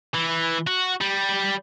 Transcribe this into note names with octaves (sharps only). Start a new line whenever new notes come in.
E3
F#4
G3